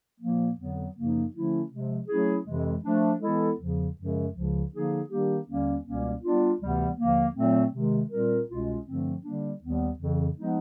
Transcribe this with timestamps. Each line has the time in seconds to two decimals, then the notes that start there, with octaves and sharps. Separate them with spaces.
0.21 A#2 F3 A#3
0.58 F2 D3 F#3 B3
0.96 F#2 C#3 F3 A#3 D#4
1.33 D3 F3 A3 C#4 E4
1.71 C3 F3 G#3
2.08 F#3 A3 C#4 E4 G#4
2.46 F2 C3 E3 G#3
2.84 F3 A3 D4
3.21 E3 G#3 B3 E4 A4
3.59 E2 C#3 F3
3.97 F#2 C#3 F3 G#3
4.34 C#2 C#3 F3
4.72 D3 F3 A#3 D#4 G#4
5.09 D#3 G3 A#3 D4 G4
5.48 D#2 D3 G3 A#3 C#4
5.85 C#2 B2 G3 A#3 C#4
6.23 G3 B3 D4 F4
6.59 D2 C3 E3 G3 B3
6.98 D#2 D3 F3 A#3
7.35 A#2 F#3 A3 C4
7.73 C3 D#3 G#3
8.10 A#2 G3 C4 F4 A#4
8.48 C2 B2 G#3 C#4 F4
8.85 G2 D3 F3 A3 C4
9.23 D3 G3 A#3 D4
9.61 D#2 D#3 G3 B3
9.98 F2 C#3 E3
10.37 F3 G#3 B3 D#4